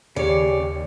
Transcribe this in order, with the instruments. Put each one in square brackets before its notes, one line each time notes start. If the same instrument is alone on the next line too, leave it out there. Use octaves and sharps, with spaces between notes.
[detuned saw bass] D#2 [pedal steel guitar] C#3 C#5 [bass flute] G4 [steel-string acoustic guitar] D5